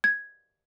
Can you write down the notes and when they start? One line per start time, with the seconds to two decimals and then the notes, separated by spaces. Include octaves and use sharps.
0.04 G#6